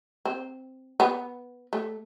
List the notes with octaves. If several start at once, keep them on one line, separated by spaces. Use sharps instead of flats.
C4
B3
A3